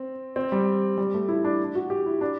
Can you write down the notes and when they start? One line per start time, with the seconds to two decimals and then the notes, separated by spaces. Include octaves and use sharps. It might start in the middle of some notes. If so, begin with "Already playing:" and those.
Already playing: C4
0.36 C4
0.52 G3
0.98 G3
1.14 A3
1.29 E4
1.44 D4
1.75 F#4
1.90 G4
2.06 E4
2.21 D4